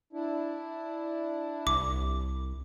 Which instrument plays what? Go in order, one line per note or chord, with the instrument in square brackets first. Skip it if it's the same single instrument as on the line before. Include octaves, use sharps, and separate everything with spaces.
[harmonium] D4 E4
[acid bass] C2 [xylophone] D6